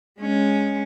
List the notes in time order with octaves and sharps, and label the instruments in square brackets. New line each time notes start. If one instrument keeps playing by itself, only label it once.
[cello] G#3 C#4